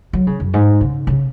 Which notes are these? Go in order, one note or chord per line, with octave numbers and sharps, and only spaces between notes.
F#3
C#3
F#2
G#2
C#3
C#3